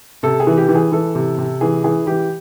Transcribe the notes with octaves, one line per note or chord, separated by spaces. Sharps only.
C3 A4
G#4
E3
G4
E3
G#4
E3 A4
C3
C3
E3 G#4
E3 G#4
E3 G4